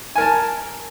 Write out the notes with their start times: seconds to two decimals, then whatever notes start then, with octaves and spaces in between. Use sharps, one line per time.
0.15 G#5
0.18 A#4
0.21 A5